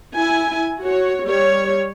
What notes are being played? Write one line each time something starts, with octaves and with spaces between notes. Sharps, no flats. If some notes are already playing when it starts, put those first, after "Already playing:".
E4 G#5
F#4 C#5
G3 C#5